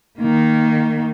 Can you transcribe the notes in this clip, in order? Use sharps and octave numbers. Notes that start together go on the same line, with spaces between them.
D#3 A#3